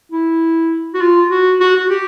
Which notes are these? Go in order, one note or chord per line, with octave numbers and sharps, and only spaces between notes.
E4
F#4
F4
F#4
F#4
F#4
G4